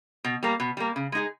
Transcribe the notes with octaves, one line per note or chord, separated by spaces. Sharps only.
B2
G3 A#3
B2
G3 A#3
C#3
G#3 D#4 G#4